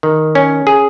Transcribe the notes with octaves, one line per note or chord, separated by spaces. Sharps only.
D#3
C#4
G#4